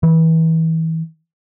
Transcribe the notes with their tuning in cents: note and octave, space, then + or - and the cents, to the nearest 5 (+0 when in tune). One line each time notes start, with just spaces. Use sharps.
E3 -30